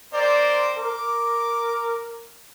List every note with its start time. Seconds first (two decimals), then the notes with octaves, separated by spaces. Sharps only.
0.13 C4 A#4 C5 D5
0.77 A#4 D6